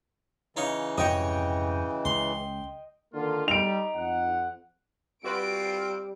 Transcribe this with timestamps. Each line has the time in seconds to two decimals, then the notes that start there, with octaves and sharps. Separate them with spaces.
0.57 C#3 E3 D#4 C#5 F5
0.98 F2 G#2 C3 F#4 C#5 D#5 G5
2.05 C#2 C6
3.14 D3 D#3 A#3 F4
3.48 G3 D#4 D7 F7
3.95 F2 F#5
5.24 G3 C4 F4 F#4 B4 D7